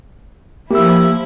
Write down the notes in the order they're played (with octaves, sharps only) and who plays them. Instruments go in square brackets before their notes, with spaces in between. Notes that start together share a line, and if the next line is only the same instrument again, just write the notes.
[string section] F3 E4 [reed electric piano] A#3 [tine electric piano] G4 E6